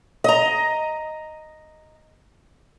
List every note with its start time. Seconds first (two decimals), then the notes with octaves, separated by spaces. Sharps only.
0.24 D#5 A#5